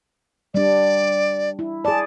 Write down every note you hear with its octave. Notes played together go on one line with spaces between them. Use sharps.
G3 D4 D5
E4
G#4 D5 A5